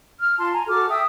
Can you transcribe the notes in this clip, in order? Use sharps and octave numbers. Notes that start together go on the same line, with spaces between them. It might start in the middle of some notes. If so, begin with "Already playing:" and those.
F6
F4 A5 C6
G#5 A#5
F#4 A4 D6 F6
E5 G5 D#6 E6